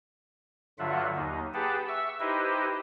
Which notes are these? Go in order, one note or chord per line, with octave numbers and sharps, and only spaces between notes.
G2 D3 F#3 F4 E5 F#5
D#2 D#4
G4 G#4 B4 F#5 G5 A5
E5 C#6 E6
D#4 E4 G4 B4 C5 D#5